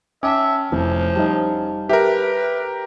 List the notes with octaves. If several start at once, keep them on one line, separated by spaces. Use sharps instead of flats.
C#4 E5 G5 A5 D6
F1 F3 E4
G3 D#4 C5 F5 A5
G4 A#4 B4 E5